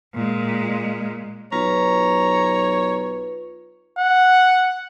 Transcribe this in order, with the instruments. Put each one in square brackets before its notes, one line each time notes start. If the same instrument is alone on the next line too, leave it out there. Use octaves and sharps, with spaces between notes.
[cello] A#2 G#3
[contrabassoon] B1 [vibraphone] F4 B4 [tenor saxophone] C#5 [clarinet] A#5
[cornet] F#5